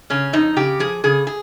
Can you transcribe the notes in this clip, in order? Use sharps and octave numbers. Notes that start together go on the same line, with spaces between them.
C#3 C#4
F2 D#4
C#3 G4
F3 G#4
C#3 G#4
G#4